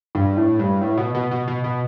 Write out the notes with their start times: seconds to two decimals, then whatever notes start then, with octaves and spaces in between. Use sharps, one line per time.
0.15 G2
0.37 A2
0.59 G2
0.81 A2
0.97 B2
1.15 B2
1.31 B2
1.48 B2
1.64 B2